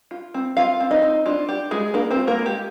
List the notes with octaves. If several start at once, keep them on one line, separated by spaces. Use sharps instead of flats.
F4
C4
C4 F4 F5
C4
D#4 D#5
C4
D4 F4
D4 G4
G#3 F4 G#4
A#3 D4 A#4
C4 C5
F4
A#3 A#4
G#3
G4